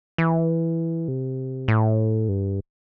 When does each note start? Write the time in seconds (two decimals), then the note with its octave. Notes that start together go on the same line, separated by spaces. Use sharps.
0.18 E3
1.08 C3
1.68 A2
2.29 G2